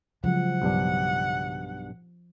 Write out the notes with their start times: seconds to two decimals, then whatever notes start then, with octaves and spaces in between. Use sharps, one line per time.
0.24 C#3 F3 F#3 G#3 F#5
0.62 B1 G2 D4